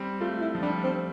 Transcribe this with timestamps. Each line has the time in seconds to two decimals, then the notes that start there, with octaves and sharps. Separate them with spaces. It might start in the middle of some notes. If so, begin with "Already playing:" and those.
Already playing: G3 C4
0.21 A3 F4
0.41 E4
0.55 F3
0.62 G3 D4
0.84 C4